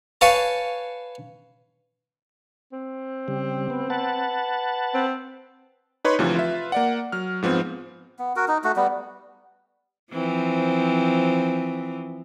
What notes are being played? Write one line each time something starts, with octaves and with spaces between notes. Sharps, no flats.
B4 C#5 F5 G#5 A5 C#6
C4
C#3 G3
B3
B4 F#5 A5
C4
D#4 B4 C#5 C6 C#6
D2 C3 E3 F3
F4 B4 E5
A#3 D5 F#5
F#3 F6
G#2 F3 B3 C4
B3
F#4 A#4
D#4
A3 F#4
G3 B3
E3 F3 C4